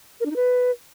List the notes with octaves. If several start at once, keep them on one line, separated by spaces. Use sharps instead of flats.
A#4
D4
D#4
B4